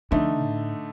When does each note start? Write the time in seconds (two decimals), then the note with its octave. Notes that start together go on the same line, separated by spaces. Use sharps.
0.11 D3 F3 A3 D#4
0.42 A2